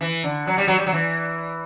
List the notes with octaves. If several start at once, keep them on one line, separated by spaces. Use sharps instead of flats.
E3
D3
F#3
G3
F#3
G3
F#3
E3